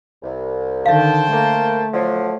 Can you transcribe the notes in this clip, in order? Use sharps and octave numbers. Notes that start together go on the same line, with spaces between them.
C2
D3 D#3 C5 E5 F5 G5 A5
A3 A#3
D3 F3 F#3